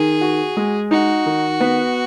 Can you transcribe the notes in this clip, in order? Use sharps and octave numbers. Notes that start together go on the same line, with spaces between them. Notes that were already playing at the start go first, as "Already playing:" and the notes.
Already playing: D#3 G#4
F#4
G#3
D#4 F#4
D#3
B3